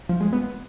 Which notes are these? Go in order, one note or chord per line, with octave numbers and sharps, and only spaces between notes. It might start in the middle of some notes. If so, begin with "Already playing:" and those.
F3
G#3
B3